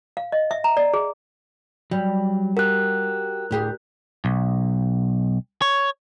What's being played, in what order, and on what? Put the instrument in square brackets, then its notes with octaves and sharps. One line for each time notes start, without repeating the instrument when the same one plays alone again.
[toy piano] F5
D#5
E5
A#5
D5
G#4
[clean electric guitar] F#3 [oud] G3
[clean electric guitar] F#4 G4 [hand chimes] A#4 F#6
[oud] D2 G4 G#4 [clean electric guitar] A2
[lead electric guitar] B1
C#5